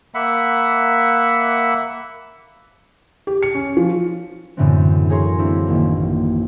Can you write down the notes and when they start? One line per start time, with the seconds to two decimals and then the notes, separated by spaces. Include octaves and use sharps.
0.15 A#3 E5 F#5 B5
3.27 G4
3.43 C#7
3.55 C#4
3.77 F3
4.57 F#2 A2 D3 E3 B3 C4
5.10 G#4 A#4 C#5 A#5 C6
5.38 A#3 C4 D4 E4
5.67 A1 D#3 A#3